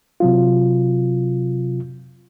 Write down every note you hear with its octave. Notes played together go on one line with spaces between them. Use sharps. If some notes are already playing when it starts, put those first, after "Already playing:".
C3 F#3 F4